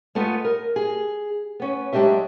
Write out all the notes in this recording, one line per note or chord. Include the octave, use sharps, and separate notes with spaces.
G#3 A3 B3 F4 B4
A#4
G#4
B3 C#4
F#3 G#3 D4 G4 D#5 E5